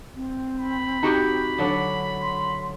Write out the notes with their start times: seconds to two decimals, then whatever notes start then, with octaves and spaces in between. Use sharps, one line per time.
0.15 C4
0.59 B5
1.03 D#4 F#4 G4
1.58 D3 F#3 D4
2.22 C6